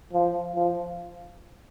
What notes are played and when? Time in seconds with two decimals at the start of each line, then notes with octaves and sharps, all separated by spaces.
0.13 F3
0.56 F3